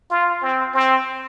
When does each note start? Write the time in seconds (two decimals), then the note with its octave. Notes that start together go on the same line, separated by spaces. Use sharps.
0.11 F4
0.42 C4
0.74 C4